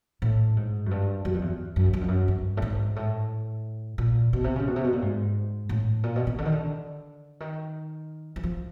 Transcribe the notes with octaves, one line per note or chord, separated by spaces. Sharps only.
A2
G#2
F#2
G2
F#2
F2
E2
F#2
F#2
F2
F#2
G2
A2
G#2
A2
A#2
B2
C3
C#3
B2
C3
B2
A#2
G#2
A2
A#2
B2
C3
D3
D#3
D3
D#3
E3
F3